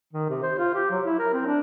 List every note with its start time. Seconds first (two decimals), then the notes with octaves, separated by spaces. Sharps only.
0.13 D#3
0.29 C3
0.42 C5
0.58 F4
0.74 G4
0.90 F#3
1.05 E4
1.19 A#4
1.33 C4
1.46 D4